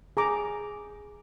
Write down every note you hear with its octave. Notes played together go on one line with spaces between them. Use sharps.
G#4 A#5 D6